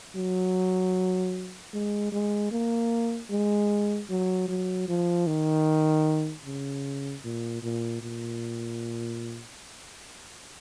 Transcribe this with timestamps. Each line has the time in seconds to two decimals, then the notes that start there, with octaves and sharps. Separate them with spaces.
0.15 F#3
1.74 G#3
2.12 G#3
2.51 A#3
3.31 G#3
4.10 F#3
4.48 F#3
4.88 F3
5.27 D#3
6.45 C#3
7.24 A#2
7.63 A#2
8.02 A#2